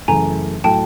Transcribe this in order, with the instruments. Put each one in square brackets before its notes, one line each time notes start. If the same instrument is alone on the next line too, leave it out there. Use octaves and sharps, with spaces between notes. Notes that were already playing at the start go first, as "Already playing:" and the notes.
[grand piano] F#2 C#3 E3 A3 [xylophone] G#5 A#5
[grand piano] A2 F#3 A3 [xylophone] G5 A5